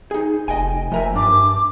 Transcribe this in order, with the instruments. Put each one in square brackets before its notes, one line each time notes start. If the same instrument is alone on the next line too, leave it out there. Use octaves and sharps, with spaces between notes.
[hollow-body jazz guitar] D#4 G#4
[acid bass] F1 [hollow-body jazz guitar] D#5 G5 G#5
[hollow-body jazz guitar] A2 A#4 G#5 [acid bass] F3 [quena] E5
[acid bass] G2 [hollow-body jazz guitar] D4 [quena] D6